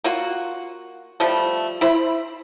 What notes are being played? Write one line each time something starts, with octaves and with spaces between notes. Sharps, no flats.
A#3 F4 F#4
F3 G3 A3
E4 C5 B5